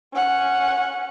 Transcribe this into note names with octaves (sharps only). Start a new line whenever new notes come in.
C#4 F#5